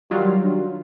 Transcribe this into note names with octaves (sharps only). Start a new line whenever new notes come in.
D#3 F#3 G3 F4
D4